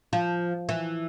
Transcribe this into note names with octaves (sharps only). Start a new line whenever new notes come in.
F3
E3